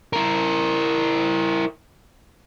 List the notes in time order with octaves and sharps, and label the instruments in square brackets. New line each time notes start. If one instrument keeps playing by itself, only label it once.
[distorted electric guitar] E4 A#4